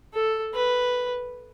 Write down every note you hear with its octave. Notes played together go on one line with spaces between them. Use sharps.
A4
B4